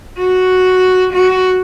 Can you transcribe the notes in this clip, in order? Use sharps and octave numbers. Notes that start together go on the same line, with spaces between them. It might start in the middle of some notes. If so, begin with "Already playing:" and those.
F#4
F#4